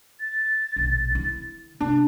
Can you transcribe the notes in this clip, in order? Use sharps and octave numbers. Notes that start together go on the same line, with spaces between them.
A6
A#1 B2
D3 E4
C3 D4